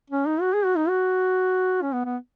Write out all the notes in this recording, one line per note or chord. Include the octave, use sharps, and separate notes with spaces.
C#4
D#4
F#4
G#4
F#4
D#4
F#4
C#4
B3
B3